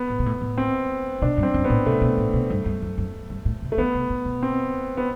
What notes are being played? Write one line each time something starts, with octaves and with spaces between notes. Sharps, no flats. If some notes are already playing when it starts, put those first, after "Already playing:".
Already playing: B3
A2
B2
A2
A2
C4
B2 D4
G2
C4
F#2
B3
A2
B2 A3
B2
A2
B2
G2
G2
F#2
F#2
G2
A2
C3
A3
E3 B3
C3
A2
B2
C4
B3